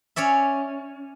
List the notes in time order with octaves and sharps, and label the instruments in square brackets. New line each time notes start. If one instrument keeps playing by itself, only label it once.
[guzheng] C#4 C#5 D5 E5